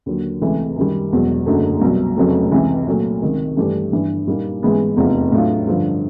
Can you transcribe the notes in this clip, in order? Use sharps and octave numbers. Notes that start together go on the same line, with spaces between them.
D#2 D3 F#3
C#2 C3 E3 A3
F#2 D#3 G3
E1 E2 B2 F#3
F#1 F#2 D3 F#3 A3
C2 B2 F#3
F1 F2 C#3 F#3 A3
C#2 C3 E3
A#2 F#3 A3
C#2 C3 D#3
G2 E3 A3 D4 G4
G1 G2 E3
A#2 G3 A#3 D#4
A1 G#2 E3 G#3 B3
F1 E2 C3 F3
A2 F#3 A3 D4 F4
G2 D3 F3